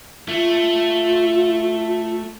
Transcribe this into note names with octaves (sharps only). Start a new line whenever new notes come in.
A3 F4